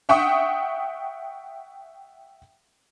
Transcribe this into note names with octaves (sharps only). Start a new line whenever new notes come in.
E5 F#5 G5 C#6 D#6